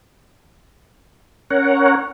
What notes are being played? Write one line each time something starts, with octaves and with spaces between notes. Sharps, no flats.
C#4 A#4 C#5 F#5